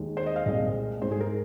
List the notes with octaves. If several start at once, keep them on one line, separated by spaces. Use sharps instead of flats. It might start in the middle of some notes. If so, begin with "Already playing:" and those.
Already playing: D#2 D#3 G#3
C5
D#5
F5
C2 A#2 G#3 D#5
G#2 G#3 C5
G#4
A#4